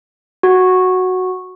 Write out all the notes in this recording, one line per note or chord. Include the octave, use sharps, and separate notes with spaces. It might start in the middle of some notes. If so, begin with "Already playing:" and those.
F#4